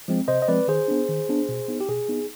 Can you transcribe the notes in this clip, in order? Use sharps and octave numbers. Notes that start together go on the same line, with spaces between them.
F3 G#3 C4
C3 C5 D#5
D#5
F3 G#3 C4 B4 D5
D#3 G#4 C5
B3 D4
D#3
B3 D4
B2
B3 D#4
G4
B2 G#4
B3 D#4